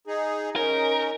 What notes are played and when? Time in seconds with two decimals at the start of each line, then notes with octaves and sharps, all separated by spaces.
0.07 D#4 G#4
0.56 C#4 D#4 A#4